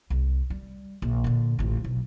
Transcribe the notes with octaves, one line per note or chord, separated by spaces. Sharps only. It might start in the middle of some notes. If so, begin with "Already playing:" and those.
C2
G3
A#1
A#2 D3
A1 F2
B1